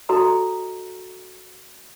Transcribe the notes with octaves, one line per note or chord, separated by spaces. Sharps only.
F#4 A4 D#5 A#5